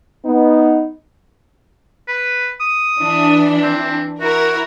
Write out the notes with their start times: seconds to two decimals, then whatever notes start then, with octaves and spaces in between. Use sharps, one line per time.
0.25 B3 D#4
2.08 B4
2.60 D#6
3.00 E3 D4
3.63 C4
4.21 E4 F#4 A#4